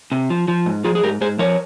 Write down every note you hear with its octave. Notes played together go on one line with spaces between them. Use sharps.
C3
F3
F3
G#2
F3 F4 G#4
G#4
G#2 G4 A#4
G#2 G#4 C5
F3 A#4 C#5